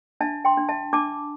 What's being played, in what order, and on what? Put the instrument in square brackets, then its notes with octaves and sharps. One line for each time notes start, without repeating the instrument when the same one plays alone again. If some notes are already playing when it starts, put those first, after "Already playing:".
[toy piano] D4 E5 A5
G5 C6
D4
E5 A5
D4 A5 D6